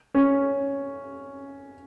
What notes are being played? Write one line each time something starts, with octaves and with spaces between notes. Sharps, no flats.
C#4